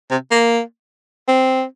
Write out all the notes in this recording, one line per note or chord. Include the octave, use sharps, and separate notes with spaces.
C3
A#3
C4